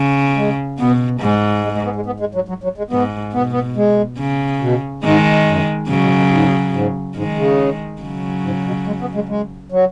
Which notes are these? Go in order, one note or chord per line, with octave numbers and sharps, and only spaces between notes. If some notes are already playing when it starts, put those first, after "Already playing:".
Already playing: C#3
G#3
B2 B3
G#2 G#3
G#3
G#3
B3
G#3
B3
G#3
F#3
F#3
F#3
G#3
G#2 B3
B2 B3
B3
G#3
C#3
B2
G#2 D#3 G#3
F#2
G#2 C#3 F#3
B2
B2
G#2
G#2
G#2 D#3 G#3
C#3
C#3 F#3
G#2
B2
G#3
B3
G#3
G#3
F#3